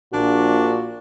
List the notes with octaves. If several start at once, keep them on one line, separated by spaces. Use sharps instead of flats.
A#1 A#2 D4 F#4